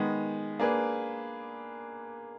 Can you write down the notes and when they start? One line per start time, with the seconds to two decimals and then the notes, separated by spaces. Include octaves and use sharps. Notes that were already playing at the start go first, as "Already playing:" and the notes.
Already playing: D#3 G#3 B3
0.60 A#3 D4 G#4 B4